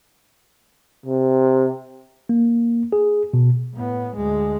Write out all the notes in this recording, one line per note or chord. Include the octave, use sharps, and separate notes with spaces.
C3
A#3
G#4
B2
A2 B3
D2 G#3